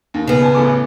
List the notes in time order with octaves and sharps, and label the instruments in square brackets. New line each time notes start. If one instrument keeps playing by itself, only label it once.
[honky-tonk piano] D#2
[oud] C#3 B3
[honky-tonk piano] G#5 A5
A1 A3 D6